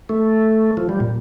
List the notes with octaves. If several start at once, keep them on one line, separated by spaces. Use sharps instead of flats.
A3
F3
G3
A#2